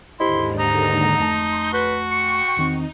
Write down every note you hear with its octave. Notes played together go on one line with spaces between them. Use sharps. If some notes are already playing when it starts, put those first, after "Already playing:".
D#2 G#2 D3 E4 G4 C5 D#5 C6
D#4 A#5
F2 A3 A5 C6 G6
F#4 B4
G5 C#6
E2 D#3 C4 D#4